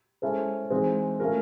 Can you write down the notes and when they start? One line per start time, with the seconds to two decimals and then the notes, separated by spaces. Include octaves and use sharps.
0.22 G#3 C#4 E4 A4 C5
0.70 E3 G#3 C4 D#4
1.20 A3 C#4 F4 A#4